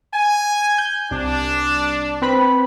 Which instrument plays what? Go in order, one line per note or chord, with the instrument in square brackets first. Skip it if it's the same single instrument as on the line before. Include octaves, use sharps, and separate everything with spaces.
[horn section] G#5
[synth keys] G6
[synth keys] C2 [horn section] D4
[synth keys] C4 B4 B5